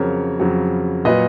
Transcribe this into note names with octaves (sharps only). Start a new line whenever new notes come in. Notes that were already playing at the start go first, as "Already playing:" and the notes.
Already playing: F2 C#3 F#3 A#4 C#5
F2 C#3 F#3
A#2 F#3 B4 D#5